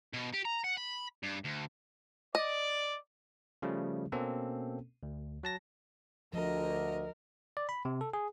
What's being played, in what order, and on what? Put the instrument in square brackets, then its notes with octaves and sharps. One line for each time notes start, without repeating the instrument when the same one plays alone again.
[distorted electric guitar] B2
G4
A#5
F#5
B5
G2
D2
[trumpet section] D5 [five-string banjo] D#5
[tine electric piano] C#3 F3 G3 A3
B2 A#3 C4 C#4 A4
D2
F#3 A5 A#6
[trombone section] D2 [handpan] F3 [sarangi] A#4 [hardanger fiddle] D#5
[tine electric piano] D5
B5
C3
A4
G#4